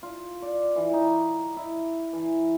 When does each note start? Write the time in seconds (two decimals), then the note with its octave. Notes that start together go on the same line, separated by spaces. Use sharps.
0.03 F4
0.42 D5
0.76 E3
0.93 D#4
1.57 E4
2.13 E3